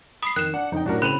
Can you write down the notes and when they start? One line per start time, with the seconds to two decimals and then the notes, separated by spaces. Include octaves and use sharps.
0.23 B5 D#6 C7
0.36 F2 D#3 F#6 E7
0.54 D4 F#5
0.72 F2 D3 D#4 G5
0.86 F#2 A2 D4 F#4 A#4
1.02 C#3 C4 B5 F#6 D#7 F7